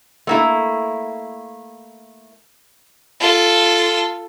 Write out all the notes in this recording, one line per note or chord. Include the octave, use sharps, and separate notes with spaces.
A3 A#3 E4
F4 A4